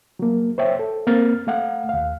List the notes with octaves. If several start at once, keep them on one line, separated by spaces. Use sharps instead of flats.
F#3 A#3
C5 C#5 E5 G5
A4
A#3 C4 F6 A6
A3 F5 F#5
D#2 F5